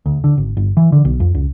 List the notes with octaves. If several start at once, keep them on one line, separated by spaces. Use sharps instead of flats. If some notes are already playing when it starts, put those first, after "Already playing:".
D2
D3
G#1
G1
E3
D3
B1
F2
C#2